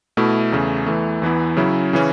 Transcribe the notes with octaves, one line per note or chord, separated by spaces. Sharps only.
B2 A3 E4
E2 C#3 A3
E2 E3 A3
E2 E3 B3 E4
C#3 F#3 C#4 E4
C#3 E3 C#4